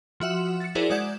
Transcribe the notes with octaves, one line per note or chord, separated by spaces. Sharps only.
F3 F#4 E5 F#5 E7
A6 C#7
E4 F#4 G#4 A#4 C5 D5
G#3 D5 F#5 G6 G#6 E7